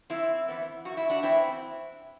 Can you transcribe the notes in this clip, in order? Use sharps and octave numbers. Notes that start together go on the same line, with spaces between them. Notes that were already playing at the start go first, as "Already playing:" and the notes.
F#2 C4 E4
E3 B3
F#2 F#4
E4
D4 F#4
E3 B3 C4 E4